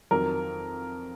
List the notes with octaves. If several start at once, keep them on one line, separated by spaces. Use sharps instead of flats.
F2 D#3 F#3 A#4